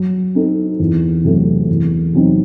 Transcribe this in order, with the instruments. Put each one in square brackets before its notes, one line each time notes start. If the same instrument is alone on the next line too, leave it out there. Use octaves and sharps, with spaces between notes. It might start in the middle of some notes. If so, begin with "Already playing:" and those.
Already playing: [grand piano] F#3
C4 D#4 A4
E2
C3 F#3 A3
E2
C3 F#3 C4 D#4